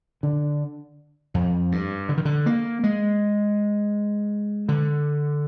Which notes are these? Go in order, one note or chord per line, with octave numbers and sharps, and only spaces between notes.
D3
F2
G2
D3
D#3
D3
A#3
G#3
D3